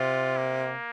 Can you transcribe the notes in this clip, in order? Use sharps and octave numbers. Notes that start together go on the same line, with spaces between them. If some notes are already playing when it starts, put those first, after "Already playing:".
Already playing: C3 F4
A#3